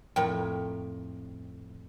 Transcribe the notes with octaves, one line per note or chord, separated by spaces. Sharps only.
F2 A2 A#4 C#5 G5